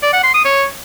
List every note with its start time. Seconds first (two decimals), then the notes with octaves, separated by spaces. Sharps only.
0.03 D5
0.13 F#5
0.24 C6
0.34 D#6
0.45 C#5